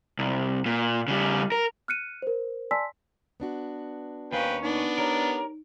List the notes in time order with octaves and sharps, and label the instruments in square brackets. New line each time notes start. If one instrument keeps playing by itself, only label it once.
[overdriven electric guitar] C2
A#2
C#3 G3
A#4
[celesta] F6 F#6 C#7 D#7
A#4 C5
D5 G#5 A5 C6 E6 B6
[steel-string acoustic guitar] B3 D4 F#4
[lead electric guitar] D#2 C#4 [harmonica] B4 G5 [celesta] C5 F5 G#5
[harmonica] B3 D4 [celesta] D#4
[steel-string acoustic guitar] G4 C#5 D5 [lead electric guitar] A#4